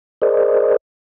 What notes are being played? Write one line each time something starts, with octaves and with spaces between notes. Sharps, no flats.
G#4 A#4 C5 D5 D#5